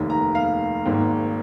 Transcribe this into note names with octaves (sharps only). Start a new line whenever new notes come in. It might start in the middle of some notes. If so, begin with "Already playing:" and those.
Already playing: F1 D#2 D#3 A#3
A#5
F5
G#1 G#2 D#3 A#3